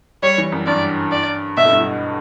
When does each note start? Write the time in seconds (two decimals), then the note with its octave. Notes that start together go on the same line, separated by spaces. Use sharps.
0.23 G3 C#5
0.38 E3
0.52 F#2
0.67 G2 D5
1.12 D5
1.57 B2 E5
1.64 A2
1.72 G2
1.79 A2